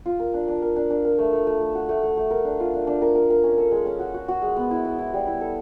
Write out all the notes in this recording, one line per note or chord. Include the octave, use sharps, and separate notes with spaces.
F4
A#4
D4
D4
A#4
D4
D4
A#4
A3
A3
A3
A3
F#4
A3
A3
A3
A#4
D4
F4
D4
D4
A#4
A#4
A#4
C#4
A4
G#3
C#4
F#4
F#4
F#4
G#3
B3
E4
B3
E4
G3
E4
A4